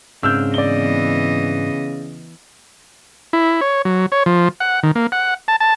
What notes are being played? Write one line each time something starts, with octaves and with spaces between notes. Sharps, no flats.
G#2 C#3 C4 D4 E6 F6 G6
E3 B3 D5 D#5 G7
E4
C#5
F#3
C#5
F3
F#5
D#3
A#3
F#5
A5
A5